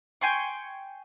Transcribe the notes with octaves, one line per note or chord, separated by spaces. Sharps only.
G5 G#5 C6 C#6